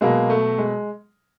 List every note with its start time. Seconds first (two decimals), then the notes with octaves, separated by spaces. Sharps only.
0.01 B2 F#3 G#3 A#3
0.30 A3
0.58 G#3